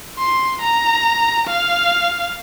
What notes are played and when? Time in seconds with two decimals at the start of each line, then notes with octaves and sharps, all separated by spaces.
0.18 C6
0.62 A#5
1.48 F5